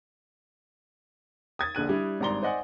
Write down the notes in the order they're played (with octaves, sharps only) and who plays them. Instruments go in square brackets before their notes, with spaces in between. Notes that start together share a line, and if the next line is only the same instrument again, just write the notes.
[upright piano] D#6 G#6 A6
A#1 D3 F#6 D#7
G3 D4 E4
G#1 G2 D5 A#5 C6 G7
C5 D5 D#5 F#5 G#5